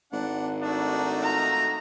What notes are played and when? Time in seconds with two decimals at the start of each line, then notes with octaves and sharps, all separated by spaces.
0.13 G#1 D4 F#5
0.62 A3 D4 D#4 F#4
1.23 F4 A#5